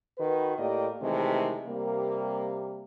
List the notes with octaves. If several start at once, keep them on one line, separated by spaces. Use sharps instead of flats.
D#3 F#4 B4
A2 A#3 G4 D5 D#5
C3 D#3 E3 G#3 A3
C3 G3 A#3